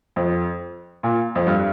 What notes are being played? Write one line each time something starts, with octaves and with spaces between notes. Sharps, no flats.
F2
A#2
F2
G2